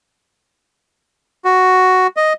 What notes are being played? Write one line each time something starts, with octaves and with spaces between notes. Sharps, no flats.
F#4
D#5